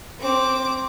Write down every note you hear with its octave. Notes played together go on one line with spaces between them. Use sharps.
C4 D6